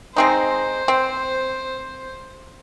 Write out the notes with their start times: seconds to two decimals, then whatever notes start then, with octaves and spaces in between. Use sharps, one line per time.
0.16 G#3 C4 D#4 C5
0.88 C4